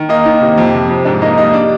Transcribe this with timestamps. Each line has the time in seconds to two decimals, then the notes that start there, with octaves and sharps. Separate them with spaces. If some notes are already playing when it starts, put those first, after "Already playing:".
Already playing: D#3
0.09 A#3 D#4 D#5
0.25 D#3
0.41 C3
0.58 F2
0.74 C3
0.89 F2
1.05 G#2 D4 D5
1.22 A#3 D#4 D#5
1.38 G3 D#4 D#5
1.54 D4 D5